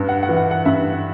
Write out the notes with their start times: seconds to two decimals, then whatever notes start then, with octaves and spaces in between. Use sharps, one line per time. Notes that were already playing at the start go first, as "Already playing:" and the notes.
Already playing: G2
0.09 F#5
0.23 F#5
0.29 E3
0.36 F#5
0.51 F#5
0.65 G2 E5